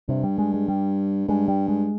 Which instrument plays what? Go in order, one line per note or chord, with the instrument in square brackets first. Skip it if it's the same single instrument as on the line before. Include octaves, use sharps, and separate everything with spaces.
[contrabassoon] G2 [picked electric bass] C3
[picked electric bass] G3
G#3
G#3
G3
[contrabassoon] G2 [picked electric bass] G#3
[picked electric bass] G3
G#3